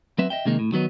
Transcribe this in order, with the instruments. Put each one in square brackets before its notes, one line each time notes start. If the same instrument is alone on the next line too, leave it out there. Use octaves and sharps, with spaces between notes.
[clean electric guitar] F#3 C4 B4 E5
D#5 E5 G5
C3 D#3 G#3 A#3 D#4
A2
D#3 F#3 B3 D#4